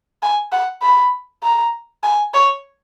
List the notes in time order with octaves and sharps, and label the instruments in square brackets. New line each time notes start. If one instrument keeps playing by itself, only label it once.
[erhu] G#5
F#5
B5
A#5
G#5
C#5